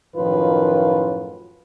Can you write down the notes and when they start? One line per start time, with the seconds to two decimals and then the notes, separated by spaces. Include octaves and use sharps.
0.15 F#2 A2 D#3 F3 F4 B4